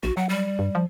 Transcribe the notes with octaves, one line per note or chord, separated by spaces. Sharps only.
A#1 F#4
F#3 F#5
G3
G2
F3